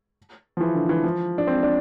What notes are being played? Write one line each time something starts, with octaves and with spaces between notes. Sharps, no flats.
F3
E3
D3
E3
F3
D4
C4
D4